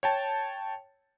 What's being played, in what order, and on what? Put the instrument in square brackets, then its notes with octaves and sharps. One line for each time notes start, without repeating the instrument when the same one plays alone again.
[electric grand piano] C#5 G5 A5